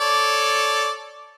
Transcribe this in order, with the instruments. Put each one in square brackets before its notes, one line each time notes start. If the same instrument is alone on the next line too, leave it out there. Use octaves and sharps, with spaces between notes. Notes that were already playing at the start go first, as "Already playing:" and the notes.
[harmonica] A4 C#5 D5